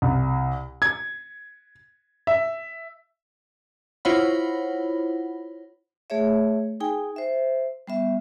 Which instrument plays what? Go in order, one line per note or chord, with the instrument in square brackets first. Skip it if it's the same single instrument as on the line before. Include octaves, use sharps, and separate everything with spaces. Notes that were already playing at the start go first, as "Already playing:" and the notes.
[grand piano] C2
G#6
E5
[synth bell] E4 F4 C5 C#5 F#5 B5
[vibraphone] A3 G#4 C#5 E5
D#4 G#4 G5 G#5
C5 E5
G3 B3 E5